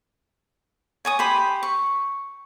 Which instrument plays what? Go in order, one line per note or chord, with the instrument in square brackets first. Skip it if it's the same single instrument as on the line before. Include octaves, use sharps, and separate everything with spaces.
[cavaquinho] C#5 G#5 D#6
G4 C5 B5
C#6